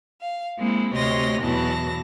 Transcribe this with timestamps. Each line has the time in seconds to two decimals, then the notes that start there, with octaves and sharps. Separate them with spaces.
0.20 F5
0.58 G#3 A#3 C4 E4
0.95 D2 C3 C#5 D#5 C6 A#6
1.41 E2 B2 E3 F#3 A5 A#6